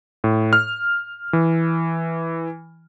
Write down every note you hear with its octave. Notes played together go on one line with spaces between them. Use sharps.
A2
F6
E3